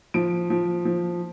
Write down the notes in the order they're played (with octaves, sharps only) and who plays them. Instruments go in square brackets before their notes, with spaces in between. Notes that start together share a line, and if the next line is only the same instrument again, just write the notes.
[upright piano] F3 D7
F3
F3